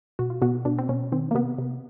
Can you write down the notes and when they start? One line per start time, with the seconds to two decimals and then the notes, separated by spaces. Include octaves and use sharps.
0.19 B2 F#4
0.30 F4
0.42 B2 F#4
0.65 B2 D4
0.78 C4
0.89 B2 C#4
1.12 D#3 C4
1.31 A#3
1.35 C3 B3
1.58 C3